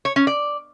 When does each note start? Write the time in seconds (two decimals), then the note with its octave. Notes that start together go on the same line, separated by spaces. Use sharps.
0.05 C#5
0.16 C#4
0.27 D5